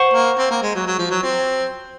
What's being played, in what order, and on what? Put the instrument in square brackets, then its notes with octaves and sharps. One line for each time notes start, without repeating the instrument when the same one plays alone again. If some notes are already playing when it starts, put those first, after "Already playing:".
Already playing: [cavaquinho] C5 F#5 C#6
[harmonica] A#3
C4
A#3
G#3
F#3
F#3
F3
F#3
C4